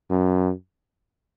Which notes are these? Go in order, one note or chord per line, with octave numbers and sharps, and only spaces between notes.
F#2